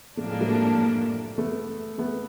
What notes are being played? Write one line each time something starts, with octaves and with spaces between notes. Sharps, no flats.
A2 F3 A3 A#3 D4
G#3
G3 A3
A3 B3
A3 B3